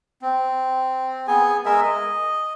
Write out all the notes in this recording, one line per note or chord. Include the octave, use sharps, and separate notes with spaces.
C4
B3 G#4 G#5
G#3 G#4 A#4 E5
D#5